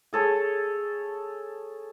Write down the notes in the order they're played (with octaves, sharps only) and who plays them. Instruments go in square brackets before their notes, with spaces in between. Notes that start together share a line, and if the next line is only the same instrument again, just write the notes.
[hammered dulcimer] G#4 A4 C#5